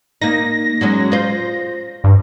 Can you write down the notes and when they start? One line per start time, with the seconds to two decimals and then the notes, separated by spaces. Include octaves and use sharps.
0.22 A#3 D#4 A#6
0.81 F#3 G#3 C#4
1.12 F4 C5
2.04 G2